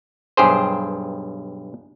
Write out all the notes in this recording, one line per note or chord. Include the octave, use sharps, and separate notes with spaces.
B1 G2 G4 G#4 C5